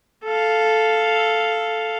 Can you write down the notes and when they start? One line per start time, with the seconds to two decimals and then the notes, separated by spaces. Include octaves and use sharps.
0.24 A4 F5